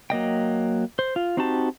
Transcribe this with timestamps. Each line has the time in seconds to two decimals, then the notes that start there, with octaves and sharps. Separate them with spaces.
0.10 F#3 A#3 D#5 G5
0.99 C5
1.16 F4
1.37 C4 D#4 F#4 G4 A5